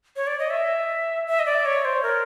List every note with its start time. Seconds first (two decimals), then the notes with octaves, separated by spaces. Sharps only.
0.16 C#5
0.27 D5
0.39 D#5
0.50 E5
1.27 E5
1.39 D#5
1.46 D5
1.65 C#5
1.85 C5
2.03 A#4